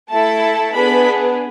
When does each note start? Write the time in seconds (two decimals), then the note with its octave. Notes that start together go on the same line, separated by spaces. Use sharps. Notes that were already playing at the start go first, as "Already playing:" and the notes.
0.11 A3 E4 A4 A5
0.73 B3 D4 G#4 B5